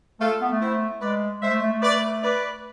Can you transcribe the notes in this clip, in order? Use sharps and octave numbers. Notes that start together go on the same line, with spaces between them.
A3 F4 A4
B3
A3
C4 E4
G#3 B4 D5
G#3 C5 E5
A3
A3
A3
B4 D5
B4 D5